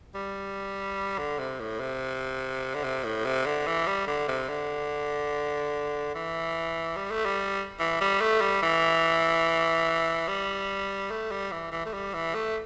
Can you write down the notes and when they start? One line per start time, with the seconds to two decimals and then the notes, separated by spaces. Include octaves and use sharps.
0.15 G3
1.18 D3
1.39 C3
1.60 A2
1.80 C3
2.75 D3
2.83 C3
3.04 A2
3.25 C3
3.46 D3
3.67 E3
3.87 G3
4.07 D3
4.28 C3
4.49 D3
6.15 E3
6.96 G3
7.11 A3
7.25 G3
7.79 E3
8.01 G3
8.21 A3
8.41 G3
8.62 E3
10.28 G3
11.11 A3
11.32 G3
11.52 E3
11.72 E3
11.86 A3
11.94 G3
12.14 E3
12.35 A3